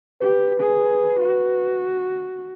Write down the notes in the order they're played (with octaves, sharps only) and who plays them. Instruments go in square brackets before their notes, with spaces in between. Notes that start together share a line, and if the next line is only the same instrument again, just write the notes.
[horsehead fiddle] G4 [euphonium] B4
[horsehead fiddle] G#4
F#4